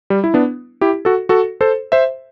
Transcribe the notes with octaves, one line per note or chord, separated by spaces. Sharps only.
G3
E4
B3 D4
E4 G4
F#4 A4
F#4 A4
A4 C5
C5 E5